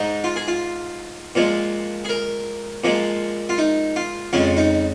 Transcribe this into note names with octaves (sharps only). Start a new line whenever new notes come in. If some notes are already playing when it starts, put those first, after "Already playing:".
Already playing: G#2 G#3 D#4
F4
G#4
F4
A#2 F3 G#3
G#4
A#4
A#2 F3 G#3
F4
D#4
F4
F2 C#3 G#3 F4
D#4